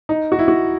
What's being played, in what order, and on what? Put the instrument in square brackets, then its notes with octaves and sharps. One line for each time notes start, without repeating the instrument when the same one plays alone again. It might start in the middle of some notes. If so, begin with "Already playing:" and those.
[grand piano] D#4
F#4
E4
F#4